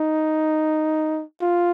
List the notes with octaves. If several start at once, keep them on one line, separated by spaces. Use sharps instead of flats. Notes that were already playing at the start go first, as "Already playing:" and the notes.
Already playing: D#4
F4